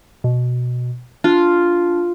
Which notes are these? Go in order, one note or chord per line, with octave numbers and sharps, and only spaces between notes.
B2
D4 F4